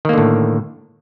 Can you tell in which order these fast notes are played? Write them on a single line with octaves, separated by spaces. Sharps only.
D#3 A#3 D3 A2